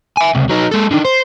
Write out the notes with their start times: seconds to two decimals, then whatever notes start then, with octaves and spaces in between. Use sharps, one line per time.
0.17 E5 G#5
0.35 C#2 C3
0.49 F#3 D#4
0.71 G#3 A4
0.91 D3 D#3
1.05 C5